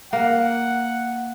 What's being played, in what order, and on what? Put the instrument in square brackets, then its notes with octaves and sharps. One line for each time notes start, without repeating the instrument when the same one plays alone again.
[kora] A#3 [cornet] F#5